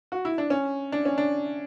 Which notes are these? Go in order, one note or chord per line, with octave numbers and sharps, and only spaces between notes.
F#4
E4
D4
C#4
D4
C#4
D4